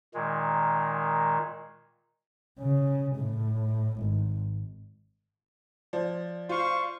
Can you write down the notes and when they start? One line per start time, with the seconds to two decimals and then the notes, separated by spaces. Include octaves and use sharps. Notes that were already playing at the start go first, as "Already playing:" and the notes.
0.14 A#2 D#3 G#3
2.59 C#3
3.16 A2
3.98 G#1
5.93 F3 D5
6.49 F4 C5 F5 C#6